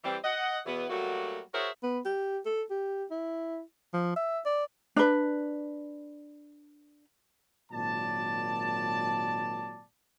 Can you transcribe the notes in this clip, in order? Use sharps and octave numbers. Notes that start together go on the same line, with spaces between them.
E3 G3 C4
D#5 F#5
E2 B2 E3 B3
F#3 G3 A3 A#3 F#4
F#4 G#4 A#4 C5 C#5 E5
B3
G4
A4
G4
E4
F3
E5
D5
D4 B4
G#1 A#2 F#3 D5 A5